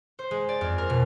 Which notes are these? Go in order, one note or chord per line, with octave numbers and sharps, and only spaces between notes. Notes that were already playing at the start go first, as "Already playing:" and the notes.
C5
G#3
D5
F2
A#4
B2